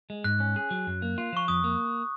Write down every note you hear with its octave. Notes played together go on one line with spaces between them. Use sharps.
G#3
G#2 F#6
C#4
G#4
F#3
F#2
A#3
F4
F3 C#6
F2 D#6
A#3